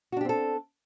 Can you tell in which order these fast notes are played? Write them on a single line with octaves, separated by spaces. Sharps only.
F#4 D4 G4 C4 A4